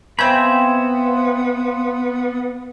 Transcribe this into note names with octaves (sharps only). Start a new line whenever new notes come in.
B3 C4 E5 F5 G#5 B5 C6 G6